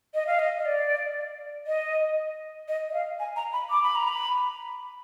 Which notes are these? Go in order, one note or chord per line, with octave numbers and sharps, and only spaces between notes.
D#5
F5
D#5
D#5
D5
D#5
D#5
D#5
F5
G#5
A#5
B5
D6
B5
A#5
B5